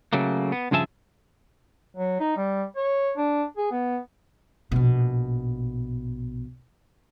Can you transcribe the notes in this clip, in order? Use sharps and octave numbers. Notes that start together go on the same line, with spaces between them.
C#3 F#3 A3 A#3
B3
G2 C#3 F3 G#4 E5 A5
F#3
D#4
G3
C#5
D4
G#4
B3
A#1 B2